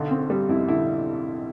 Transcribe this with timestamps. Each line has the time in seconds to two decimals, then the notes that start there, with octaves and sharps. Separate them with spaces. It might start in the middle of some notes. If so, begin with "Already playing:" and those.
Already playing: B1 D3 D#4
0.11 C4
0.30 G3
0.49 F2 E4
0.68 D3 E4